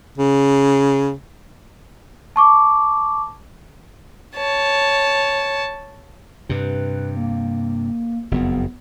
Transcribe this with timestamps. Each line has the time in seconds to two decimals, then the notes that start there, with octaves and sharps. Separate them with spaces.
0.18 C#3
2.36 A5 C#6 D6
4.37 C#5 A5
6.49 G2 C3 B4
7.16 A#3
8.31 F#1 F2 B3